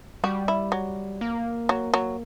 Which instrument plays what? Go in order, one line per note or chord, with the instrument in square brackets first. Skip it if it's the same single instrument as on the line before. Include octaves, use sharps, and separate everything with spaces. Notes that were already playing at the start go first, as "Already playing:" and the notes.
[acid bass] G3 [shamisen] F#4
[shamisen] E4
F#3
[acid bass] A#3
[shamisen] F#3
F#3